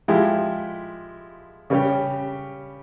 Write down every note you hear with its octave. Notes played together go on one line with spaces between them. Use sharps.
F3 G#3 E4 G4
C#3 G3 C#4 G4